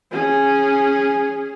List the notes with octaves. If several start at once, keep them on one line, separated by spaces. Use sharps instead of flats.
C#4 G#4